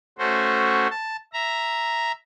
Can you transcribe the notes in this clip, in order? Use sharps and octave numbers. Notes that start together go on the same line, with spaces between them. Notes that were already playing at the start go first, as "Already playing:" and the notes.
A3 C#4 F#4 C5
A5
E5 A#5